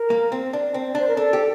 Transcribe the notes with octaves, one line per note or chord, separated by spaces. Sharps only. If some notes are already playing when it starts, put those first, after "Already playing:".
Already playing: A#4
A#3
C4
D4
C4
D4 C5
A#4
D4 A4
G4